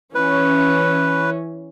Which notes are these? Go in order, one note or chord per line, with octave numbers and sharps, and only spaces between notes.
E3 C#4 B4